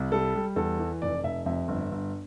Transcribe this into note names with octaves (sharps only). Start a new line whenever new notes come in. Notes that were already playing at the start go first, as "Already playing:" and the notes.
Already playing: C2
G3 A4
G3
E2 A4
E3
F1 D5
F1 E5
F2 E5
G1
G1